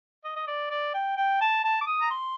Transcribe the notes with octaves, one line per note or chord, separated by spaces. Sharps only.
D#5
D#5
D5
D5
G5
G5
A5
A5
D6
D#6
A#5
C6